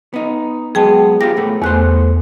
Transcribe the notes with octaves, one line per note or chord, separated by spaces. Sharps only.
B3 D#4
F#3 G#3 B3 G#4 G5 A5
B3 F4 G4 A#6
A2 A3 B3
E2 A3 B3 C5 F#6